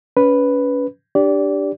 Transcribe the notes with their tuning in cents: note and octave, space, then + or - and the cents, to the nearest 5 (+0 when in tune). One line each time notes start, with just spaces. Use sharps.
C#4 +30 B4 +0
D4 +0 G4 +0 D5 -25